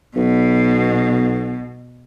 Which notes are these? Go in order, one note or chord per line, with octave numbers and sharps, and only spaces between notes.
B1 B2